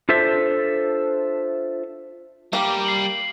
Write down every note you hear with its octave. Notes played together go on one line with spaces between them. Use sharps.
D4 F4 A4 C5 E5
G3 A#3 G4 A#4
C7 F#7